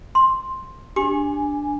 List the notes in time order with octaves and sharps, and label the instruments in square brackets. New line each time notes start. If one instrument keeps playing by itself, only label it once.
[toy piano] C6
[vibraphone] D4 G#5 [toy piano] G4